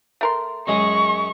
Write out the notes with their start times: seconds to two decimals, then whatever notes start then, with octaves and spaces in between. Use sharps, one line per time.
0.21 A3 A#4 C6
0.67 F#2 G#3 G#4 C#6